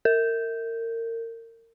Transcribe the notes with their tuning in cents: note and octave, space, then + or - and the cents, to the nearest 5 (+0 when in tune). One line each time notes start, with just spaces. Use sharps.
A#4 -30